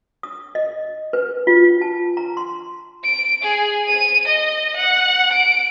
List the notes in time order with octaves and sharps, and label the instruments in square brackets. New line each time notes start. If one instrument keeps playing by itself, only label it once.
[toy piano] D#6
D#5
B4
F4
A5
A#5
C6
[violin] D7
G#4
D#7
D#5
F#5
D7